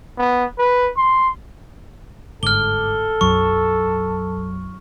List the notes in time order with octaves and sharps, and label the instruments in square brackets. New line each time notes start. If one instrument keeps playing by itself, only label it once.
[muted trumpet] B3
B4
C6
[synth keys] G1 G#2 D6 [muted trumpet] A4 [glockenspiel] F6 G7
[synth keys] B1 F#2 F#3 [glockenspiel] C#6